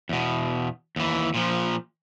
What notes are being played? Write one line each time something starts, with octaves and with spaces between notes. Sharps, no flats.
E2 B2
D#2 E3
A#2 F3